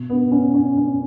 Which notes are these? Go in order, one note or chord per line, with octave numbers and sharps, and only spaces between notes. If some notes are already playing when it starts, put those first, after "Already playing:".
Already playing: B2
B3
C#4
C#4
C#4